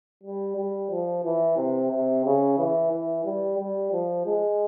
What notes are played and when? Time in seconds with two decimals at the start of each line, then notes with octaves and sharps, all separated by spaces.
0.23 G3
0.57 G3
0.91 F3
1.24 E3
1.57 C3
1.91 C3
2.25 C#3
2.58 E3
2.91 E3
3.25 G3
3.59 G3
3.92 F3
4.26 G#3